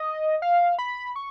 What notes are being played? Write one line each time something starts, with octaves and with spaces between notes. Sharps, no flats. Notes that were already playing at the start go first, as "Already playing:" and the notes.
Already playing: D#5
F5
B5
C#6